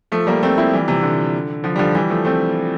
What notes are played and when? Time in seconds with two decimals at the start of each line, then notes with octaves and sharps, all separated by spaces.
0.12 F3 A3
0.27 G3 A#3
0.43 A3 C4
0.58 C4 E4
0.73 E3 G3
0.88 C3 E3
1.03 D3
1.64 D3 F3
1.76 G3
1.79 D3 F3
1.95 E3 G3
2.10 F3 A3
2.25 A3 C4